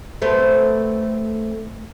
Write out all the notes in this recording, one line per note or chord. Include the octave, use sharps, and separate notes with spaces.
A3 B3 C4